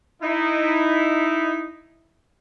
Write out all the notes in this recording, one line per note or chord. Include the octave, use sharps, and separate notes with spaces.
D#4 E4